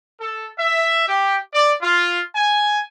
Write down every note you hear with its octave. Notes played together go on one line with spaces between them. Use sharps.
A4
E5
G4
D5
F4
G#5